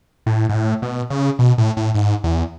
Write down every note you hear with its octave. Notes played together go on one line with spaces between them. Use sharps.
A2
G#2
A2
B2
C#3
B2
A2
A2
G#2
E2